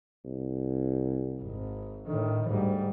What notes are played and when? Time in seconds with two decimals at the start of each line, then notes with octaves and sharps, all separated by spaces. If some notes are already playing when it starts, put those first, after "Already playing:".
0.25 C2
1.41 G#1
2.07 A2 D3 D#3
2.48 D2 G#2 G3